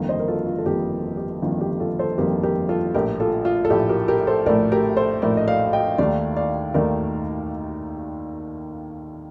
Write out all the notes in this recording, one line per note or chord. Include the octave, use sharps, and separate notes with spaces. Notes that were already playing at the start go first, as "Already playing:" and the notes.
Already playing: G1 F2 D#3 A#3
C5 D#5
A#4
F4 A4
F4
A4
G1 F2 D#3 A#3 G4
G4
G1 F2 D#3 A#3 F4
G4
F4 A4
A4 C5
G1 F2 D#3 A#3 G4 A#4
G4 A#4
F4 A4
A#1 A2 A3 G4 A#4
F4 A4
F4
A4
A#1 A2 A3 G4
G4 A#4
G4 A#4
A4 C5
A#1 A2 A3 A#4 D5
G4 A#4
A4 C5
A#1 A2 A3 A#4 D5
D#5
D5 F5
D#5 G5
D#2 D#3 A3 D5 F5
D5 F5
D#2 D#3 A3 A#4 D5